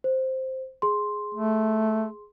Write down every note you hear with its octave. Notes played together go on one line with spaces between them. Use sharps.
C5
G#4 C6
A3